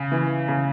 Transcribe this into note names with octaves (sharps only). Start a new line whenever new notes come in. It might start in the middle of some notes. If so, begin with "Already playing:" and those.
Already playing: C#3
E3
C#3